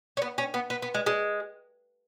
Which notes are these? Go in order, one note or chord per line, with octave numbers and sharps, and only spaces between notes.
C#4
B3
C#4
B3
B3
B3
G#3
G#3